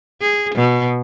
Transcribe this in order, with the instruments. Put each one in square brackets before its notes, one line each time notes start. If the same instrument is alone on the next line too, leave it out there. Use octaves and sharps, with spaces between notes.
[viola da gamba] G#4
B2